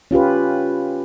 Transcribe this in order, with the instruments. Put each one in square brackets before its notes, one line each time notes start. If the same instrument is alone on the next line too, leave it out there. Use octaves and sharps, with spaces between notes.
[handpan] C#4 F4 G4 B4